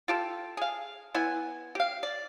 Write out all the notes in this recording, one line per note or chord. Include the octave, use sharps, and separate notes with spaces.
F4 G4 A4
G#4 F5
B3 E4 G#5
G4 F5
D5